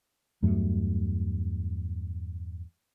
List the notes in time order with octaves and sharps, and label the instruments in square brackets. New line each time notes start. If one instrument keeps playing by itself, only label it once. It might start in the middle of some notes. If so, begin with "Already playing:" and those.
[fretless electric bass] E2 G2 F#3 A3